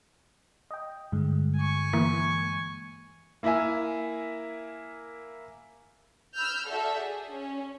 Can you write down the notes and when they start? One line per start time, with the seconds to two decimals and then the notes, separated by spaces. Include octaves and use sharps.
0.71 D#5 G5
1.12 G2 D3 G#3
1.56 G#5 C#6
1.93 E3 A#3
3.43 A#3 E4 A#4 E5 G#5
6.36 B5 E6 F6 G6
6.67 F#4 A4 D5 E5
6.98 G#4
7.30 C#4